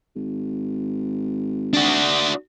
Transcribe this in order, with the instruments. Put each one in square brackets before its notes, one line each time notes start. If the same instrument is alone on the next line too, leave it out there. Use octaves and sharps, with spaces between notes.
[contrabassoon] G#1
[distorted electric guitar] D4 F#4